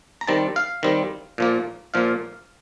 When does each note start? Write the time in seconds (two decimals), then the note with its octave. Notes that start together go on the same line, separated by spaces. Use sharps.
0.21 A#5
0.27 D#3 G3 C4 A5
0.56 F5
0.83 D#3 G3 C4
1.38 A#2 F3 A#3
1.94 A#2 F3 A#3 F5